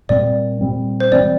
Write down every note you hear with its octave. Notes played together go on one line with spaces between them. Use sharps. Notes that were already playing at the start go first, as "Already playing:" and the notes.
A#2 G3 C4 D5
A#2 G3 C4
C5
E3 G3 C4 D5